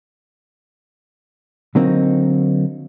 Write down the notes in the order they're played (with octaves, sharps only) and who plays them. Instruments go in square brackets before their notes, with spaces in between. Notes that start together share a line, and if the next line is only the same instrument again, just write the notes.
[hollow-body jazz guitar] D3 F#3 A#3 C4 D#4